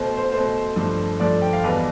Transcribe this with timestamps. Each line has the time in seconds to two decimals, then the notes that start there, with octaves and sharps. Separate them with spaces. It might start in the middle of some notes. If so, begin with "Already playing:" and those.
Already playing: B2 A3 C5
0.17 C5
0.32 B2 A3 C5
0.76 G2 F3 A3
1.20 G2 F3 A3 D5
1.42 G5
1.53 F5
1.64 E2 B2 G3 B4